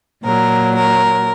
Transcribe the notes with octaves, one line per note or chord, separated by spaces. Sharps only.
A#2 F#3 A#4
A#4